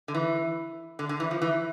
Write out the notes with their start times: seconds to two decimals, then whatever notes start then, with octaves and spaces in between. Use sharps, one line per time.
0.08 D3
0.15 E3
0.99 D3
1.09 D3
1.20 E3
1.31 F3
1.42 E3